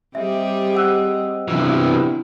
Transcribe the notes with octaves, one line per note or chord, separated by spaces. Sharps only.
G3 C4 G4 G#4 D#5 E5
F#5 E6 F#6
C3 E3 F#3 B3 D4 E4